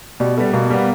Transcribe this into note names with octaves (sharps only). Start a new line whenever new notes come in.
B2 G3
G3 A3 B3
B2 A#3
G3 B3